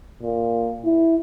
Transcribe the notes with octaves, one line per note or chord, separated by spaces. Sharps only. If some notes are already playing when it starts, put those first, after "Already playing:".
A#2
E4